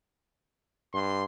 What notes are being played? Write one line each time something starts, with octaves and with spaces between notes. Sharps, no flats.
G2 C6